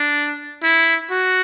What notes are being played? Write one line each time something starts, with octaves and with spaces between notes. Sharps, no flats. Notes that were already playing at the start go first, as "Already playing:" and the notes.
Already playing: D4
E4
F#4